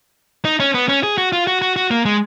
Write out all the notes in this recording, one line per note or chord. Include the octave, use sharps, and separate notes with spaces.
D#4
C#4
B3
C#4
G#4
F#4
F4
F#4
F#4
F#4
A#3
G#3